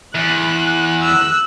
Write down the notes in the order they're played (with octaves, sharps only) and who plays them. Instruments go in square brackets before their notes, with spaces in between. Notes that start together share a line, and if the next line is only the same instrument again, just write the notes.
[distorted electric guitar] E2 [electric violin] F#6
[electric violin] E6 F#6